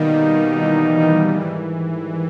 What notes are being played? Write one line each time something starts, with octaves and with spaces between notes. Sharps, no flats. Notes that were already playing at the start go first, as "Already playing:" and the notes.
Already playing: B2 D#3 G3 A#3 D#4
E3
D#3 G3
G#2 D#3 E3 G3